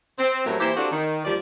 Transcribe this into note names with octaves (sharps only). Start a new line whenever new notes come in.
C4
A2 F#3 G3 A3 C4 A#4
E3 A#3 E4 G4 C5
A#3 C4 D4 F#4 G4 A4
D#3
D#2 F3 G3 D5